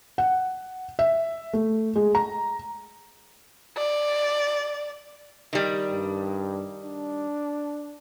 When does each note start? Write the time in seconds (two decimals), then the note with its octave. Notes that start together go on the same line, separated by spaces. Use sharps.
0.18 F#5
0.99 E5
1.53 A3
1.96 G#3
2.15 A#5
3.77 D5
5.53 D#3 G3
5.91 G2
6.83 D4